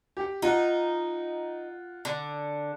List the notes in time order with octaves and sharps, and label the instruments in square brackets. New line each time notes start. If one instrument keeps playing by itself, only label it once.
[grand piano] G4 G5
[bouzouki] D#4 [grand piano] F4 F#5
[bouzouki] D3